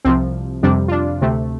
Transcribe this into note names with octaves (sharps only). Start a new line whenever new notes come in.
C2 C3 F3 C4
F2 C3 G3 D4
F4
D4
D2 C3 A3 C4